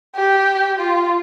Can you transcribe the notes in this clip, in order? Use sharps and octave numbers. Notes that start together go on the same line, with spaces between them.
G4
F4